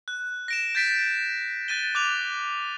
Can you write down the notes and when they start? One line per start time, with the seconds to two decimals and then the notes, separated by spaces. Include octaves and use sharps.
0.08 F#6
0.48 A#6 D7 E7
0.75 G6 A6 B6 D7
1.68 F#6 A6 D#7 G7
1.95 D6 F#6 F7